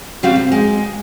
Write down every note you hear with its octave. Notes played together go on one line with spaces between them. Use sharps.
C#3 G3 C4 F#4 F5
C3
G#3